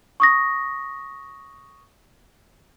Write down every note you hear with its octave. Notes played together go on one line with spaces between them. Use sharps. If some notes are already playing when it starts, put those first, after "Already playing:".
C#6 D#6 A#6